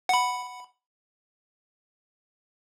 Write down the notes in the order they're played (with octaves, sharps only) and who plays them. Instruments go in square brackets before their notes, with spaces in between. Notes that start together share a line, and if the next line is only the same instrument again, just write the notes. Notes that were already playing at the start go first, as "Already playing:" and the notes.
[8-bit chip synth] F#5 B5